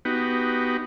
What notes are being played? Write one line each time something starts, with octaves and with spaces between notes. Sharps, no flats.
B3 D#4 F#4 G4